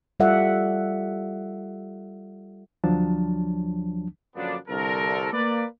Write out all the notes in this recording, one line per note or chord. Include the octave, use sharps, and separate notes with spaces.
G3 F4 A4 D5 E5 F#5
D2 F3 F#3 D4 A5
F#2 D3 F3 A#3 B3 D4
C2 D3 A4 A#4
A#3 B4 D5